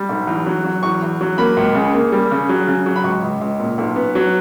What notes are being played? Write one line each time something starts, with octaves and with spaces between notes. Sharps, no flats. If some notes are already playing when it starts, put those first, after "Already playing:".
Already playing: G3
B1
E2
F#3
F#3
E2 C#6
E2
F#3
A#3 B5
C#2
C#3
A#3
G3
C#3
F#3
C#3
F#3
B5
C#2 C#6
C#2
C#2
A#2
B1
B3
F#3